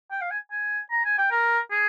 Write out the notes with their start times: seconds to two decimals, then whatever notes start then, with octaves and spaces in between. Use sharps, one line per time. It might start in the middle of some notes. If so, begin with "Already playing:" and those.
0.11 G5
0.21 F5
0.31 G#5
0.51 G#5
0.91 A#5
1.05 G#5
1.18 G5
1.31 A#4
1.71 G#4